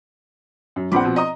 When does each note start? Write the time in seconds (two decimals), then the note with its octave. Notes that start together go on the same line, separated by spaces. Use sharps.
0.76 F#2
0.92 A#1 F3 C4 F#5 B5 D6
1.05 B2
1.16 D#5 A#5 D#6